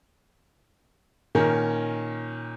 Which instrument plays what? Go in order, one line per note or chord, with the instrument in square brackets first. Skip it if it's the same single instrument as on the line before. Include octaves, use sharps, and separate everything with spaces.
[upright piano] A#2 D#3 C#4 A#4